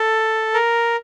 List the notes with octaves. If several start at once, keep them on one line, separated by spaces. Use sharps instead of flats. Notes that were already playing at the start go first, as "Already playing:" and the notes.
Already playing: A4
A#4